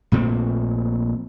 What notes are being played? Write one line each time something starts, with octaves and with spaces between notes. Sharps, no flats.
A#1 A#2 A3 C4